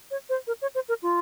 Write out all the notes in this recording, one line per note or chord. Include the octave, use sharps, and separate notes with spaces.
C#5
C5
A#4
C#5
C5
A#4
F4